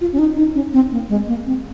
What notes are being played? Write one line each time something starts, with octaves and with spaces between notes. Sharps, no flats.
F4
C#4
D#4
D#4
C#4
C4
A#3
G#3
A#3
C4